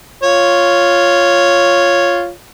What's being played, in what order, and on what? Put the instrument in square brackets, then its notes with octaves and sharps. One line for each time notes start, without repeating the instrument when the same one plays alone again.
[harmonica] F4 C#5